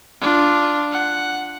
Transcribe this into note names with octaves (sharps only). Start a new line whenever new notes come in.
D4 F4
F#5